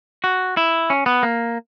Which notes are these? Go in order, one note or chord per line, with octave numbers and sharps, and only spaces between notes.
F#4
E4
C#4
B3
A#3